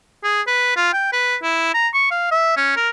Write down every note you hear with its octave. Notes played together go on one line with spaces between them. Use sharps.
G#4
B4
F4
G5
B4
E4
A#5
C#6
F5
E5
C#4
A#4